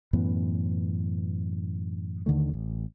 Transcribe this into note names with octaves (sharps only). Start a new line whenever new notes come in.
F#2 A2 E3 B3
D#2 D3 D#3 A3
A1